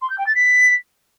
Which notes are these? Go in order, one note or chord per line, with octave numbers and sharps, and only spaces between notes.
C6
G6
G5
A6
B6